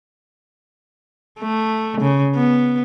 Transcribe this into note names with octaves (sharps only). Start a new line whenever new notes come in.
A3
C#3
B3